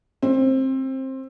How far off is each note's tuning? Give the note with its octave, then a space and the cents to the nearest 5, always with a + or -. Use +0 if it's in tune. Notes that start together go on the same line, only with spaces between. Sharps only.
C4 +20